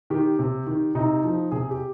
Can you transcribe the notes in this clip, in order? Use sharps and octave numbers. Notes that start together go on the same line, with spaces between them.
D#3 G4
C3
D#3
C3 D#4
F3
C3 G#4
G4